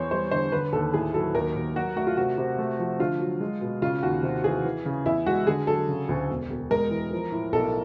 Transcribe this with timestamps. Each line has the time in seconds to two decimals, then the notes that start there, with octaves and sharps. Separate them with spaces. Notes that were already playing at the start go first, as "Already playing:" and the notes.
Already playing: E2 C5 C#5
0.11 G3 C5
0.31 D3 C5
0.52 D3 B4
0.73 D#2 A4
0.94 A2 G#4
1.14 F#3 A4
1.35 D#2 A#4
1.56 D#2
1.75 F#3 F#4
1.96 A3 F#4
2.07 F4
2.17 C3 F#4
2.38 C3
2.58 A3
2.79 F3
2.99 D3 F4
3.20 F#3
3.40 G#3
3.61 B2
3.82 C#3 F4
4.03 D#2 F#4
4.23 C3
4.44 E3 G#4
4.64 E3
4.85 C#3
5.06 E2 E4
5.26 G#3 F#4
5.47 D3 G#4
5.67 F#3 A4
5.88 C#3
6.09 D2
6.29 E1
6.50 E1
6.71 G#3 A#4
6.91 E3
7.13 F3
7.32 A2
7.53 B1 A4